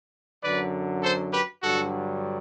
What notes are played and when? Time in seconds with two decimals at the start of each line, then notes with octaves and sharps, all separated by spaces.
0.43 F#2 D3 F#3 B4 D5
1.03 A4 C5
1.33 G4 B4
1.63 G2 D3 F#3 F#4 A4